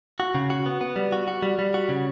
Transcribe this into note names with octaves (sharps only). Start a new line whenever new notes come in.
F#4
C#3
F#4
B3
B3
G3
F#4
F#4
G3
G3
F#4
C#3